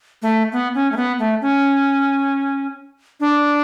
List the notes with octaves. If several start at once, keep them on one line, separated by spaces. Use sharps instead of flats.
A3
B3
C#4
A3
B3
A3
C#4
D4